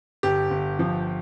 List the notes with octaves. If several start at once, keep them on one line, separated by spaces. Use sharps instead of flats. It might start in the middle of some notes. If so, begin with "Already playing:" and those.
G1 G4
G1
F3